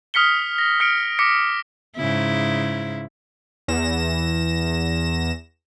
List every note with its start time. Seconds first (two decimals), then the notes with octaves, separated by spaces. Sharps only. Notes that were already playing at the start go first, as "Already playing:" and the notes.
0.14 D#6 F6 B6 C#7 G7
0.58 A#6
0.80 F6 C#7 D7
1.19 D6 A#6 B6 C#7
1.96 G#2 C#3 E4
3.68 E2 A#6 E7